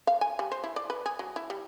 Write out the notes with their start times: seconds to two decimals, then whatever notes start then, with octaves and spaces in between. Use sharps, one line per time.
0.07 F5
0.21 G#5
0.39 G3
0.52 C5
0.64 E4
0.76 D5
0.90 B4
1.06 G#4
1.19 F#3
1.36 E4
1.50 G3